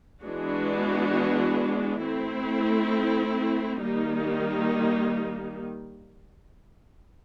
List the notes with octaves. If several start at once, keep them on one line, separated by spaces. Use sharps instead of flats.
E3 G#3 B3 D4 F#4
A3 C4 E4
D#3 G3 A#3 D#4